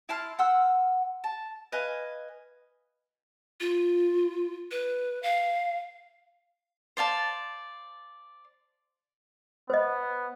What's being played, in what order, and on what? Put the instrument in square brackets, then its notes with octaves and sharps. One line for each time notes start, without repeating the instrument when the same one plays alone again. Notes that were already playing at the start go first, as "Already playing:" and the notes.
[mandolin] E4 A5 C6 F6
F#5 C6 E6 F6
A5
B4 D#5 F5 G#5
[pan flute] F4
B4
F5
[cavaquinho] C5 D5 F5 A5
[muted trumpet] B3 [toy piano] C5 D#5